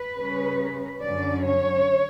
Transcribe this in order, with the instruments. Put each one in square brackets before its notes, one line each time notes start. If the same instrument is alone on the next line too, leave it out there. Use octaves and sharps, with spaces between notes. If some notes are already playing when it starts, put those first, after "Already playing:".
Already playing: [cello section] B4
C#3 G3 C#4
F#2 D3 F#3 C#4 D5
C#5